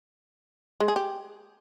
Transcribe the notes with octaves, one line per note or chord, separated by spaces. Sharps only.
G#3
G#4
G4